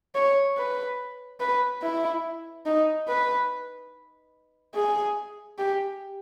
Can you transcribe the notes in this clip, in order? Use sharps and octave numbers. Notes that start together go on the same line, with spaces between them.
C#5
B4
B4
E4
D#4
B4
G#4
G4